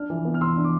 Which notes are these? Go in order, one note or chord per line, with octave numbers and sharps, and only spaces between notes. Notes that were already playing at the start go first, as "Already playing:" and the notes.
Already playing: D4 F6
E3
B3
F6
E3 C6 E6
D4
D6